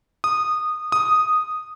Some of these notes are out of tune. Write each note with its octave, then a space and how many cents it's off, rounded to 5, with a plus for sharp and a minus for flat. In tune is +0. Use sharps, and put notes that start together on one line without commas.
D#6 -15
D#6 -5